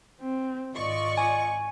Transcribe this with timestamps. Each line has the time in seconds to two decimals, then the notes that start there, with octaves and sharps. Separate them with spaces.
0.21 C4
0.76 G#1 F4 D5 D#5 C#6
1.17 G#5